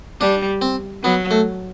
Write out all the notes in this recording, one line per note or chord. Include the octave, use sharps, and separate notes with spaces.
G3 D4
C4
F#3 B3
A3